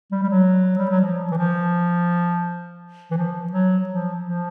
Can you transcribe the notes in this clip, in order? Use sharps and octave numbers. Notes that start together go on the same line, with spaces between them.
G3
G3
F#3
G3
F#3
F3
E3
F3
E3
F3
F#3
F3
F3